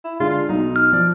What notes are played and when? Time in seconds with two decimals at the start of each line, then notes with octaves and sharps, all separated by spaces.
0.04 E4
0.20 D3 G#3 D4 F4
0.49 B1 B2 D#4
0.76 F6
0.93 F3 D5